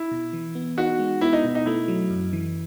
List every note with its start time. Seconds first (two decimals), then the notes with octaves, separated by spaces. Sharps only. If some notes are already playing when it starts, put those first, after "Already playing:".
Already playing: E4
0.11 B2
0.33 E3
0.55 B3
0.77 D#4 F#4
0.99 G#3
1.21 B3 E4
1.33 D#4
1.44 B2
1.55 D#4
1.66 A3 E4
1.88 F#3
2.10 F#2
2.33 E3